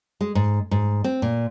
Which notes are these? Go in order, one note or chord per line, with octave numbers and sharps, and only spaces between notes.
G#3
G#2
G#2
C4
A#2